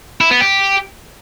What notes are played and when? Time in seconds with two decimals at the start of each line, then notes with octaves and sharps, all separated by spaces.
0.21 E4
0.31 B3
0.41 G4